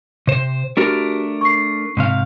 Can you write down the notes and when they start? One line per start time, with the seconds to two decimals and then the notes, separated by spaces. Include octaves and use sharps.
0.27 C3 C5
0.77 A3 D4 F#4 G4 A#4
1.41 C#6 C7
1.97 G#2 C3 F5